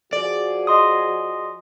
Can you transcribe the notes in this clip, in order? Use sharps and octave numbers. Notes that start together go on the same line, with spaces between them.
F3 F#4 G#4 D5
D#5 C6 D#6